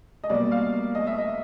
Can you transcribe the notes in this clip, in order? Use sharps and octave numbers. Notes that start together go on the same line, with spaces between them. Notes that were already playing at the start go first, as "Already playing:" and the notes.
D#5
B2 G3 A#3 D5
F5
D#5
E5
D#5